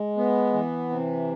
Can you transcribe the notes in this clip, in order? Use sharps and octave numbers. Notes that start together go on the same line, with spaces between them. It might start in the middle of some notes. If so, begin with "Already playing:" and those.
Already playing: G#3
B3
E3
C3